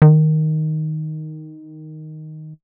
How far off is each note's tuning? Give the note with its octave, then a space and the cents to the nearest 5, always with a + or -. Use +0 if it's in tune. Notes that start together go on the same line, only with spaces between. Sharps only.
D#3 +0